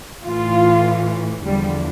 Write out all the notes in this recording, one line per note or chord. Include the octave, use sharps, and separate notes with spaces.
A2 E3 F4
E2 D3 F3 G3